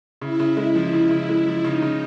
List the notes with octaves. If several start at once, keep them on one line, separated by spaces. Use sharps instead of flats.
C#3 E4
C#3
G#3
F3
C#3
C#3
G#3
F3
C#3 D#4
C#3